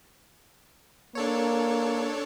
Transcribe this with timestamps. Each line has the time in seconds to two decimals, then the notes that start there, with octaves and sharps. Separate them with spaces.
1.15 A#3 D4 A4 C#5